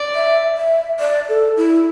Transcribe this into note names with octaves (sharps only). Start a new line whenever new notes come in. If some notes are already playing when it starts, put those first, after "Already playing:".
Already playing: D5
E5
E5
D5
A4
E4